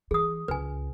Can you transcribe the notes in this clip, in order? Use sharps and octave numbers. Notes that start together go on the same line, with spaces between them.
E3 G#4 D#6
C#2 B4 G#5